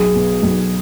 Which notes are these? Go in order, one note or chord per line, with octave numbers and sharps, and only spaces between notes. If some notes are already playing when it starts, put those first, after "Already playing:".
Already playing: B1 G#4
B2
B1